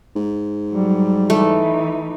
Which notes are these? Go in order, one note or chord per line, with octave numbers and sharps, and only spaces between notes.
G#2
F#3 G3
E3 A3 D#4